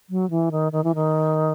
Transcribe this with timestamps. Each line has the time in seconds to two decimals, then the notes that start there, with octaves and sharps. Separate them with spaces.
0.10 F#3
0.30 E3
0.52 D#3
0.72 D#3
0.84 E3
0.95 D#3